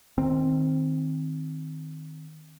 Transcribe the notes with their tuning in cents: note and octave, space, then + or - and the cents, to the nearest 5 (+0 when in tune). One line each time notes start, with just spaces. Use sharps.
D#3 +0 C4 +0